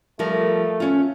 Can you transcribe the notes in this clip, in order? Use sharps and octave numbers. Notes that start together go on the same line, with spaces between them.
F3 G3 A3 A#4
C#4 F4